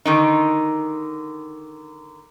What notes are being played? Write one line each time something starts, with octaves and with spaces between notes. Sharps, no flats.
D3 D#3 D#4